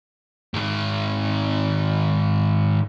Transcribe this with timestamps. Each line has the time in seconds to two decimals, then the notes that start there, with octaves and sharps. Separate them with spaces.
0.54 G#2 D#3